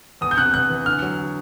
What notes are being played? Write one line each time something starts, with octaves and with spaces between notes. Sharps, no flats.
E2 D#6
G6
C3 F#6
E2 F#6
E3
D3 F6
F#3
D3